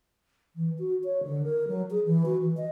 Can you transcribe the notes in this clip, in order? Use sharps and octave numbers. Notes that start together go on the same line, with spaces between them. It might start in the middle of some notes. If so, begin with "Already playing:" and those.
E3
F#4
C#5
D3
A#4
F#3
G#4
E3
F#4
E3
D#5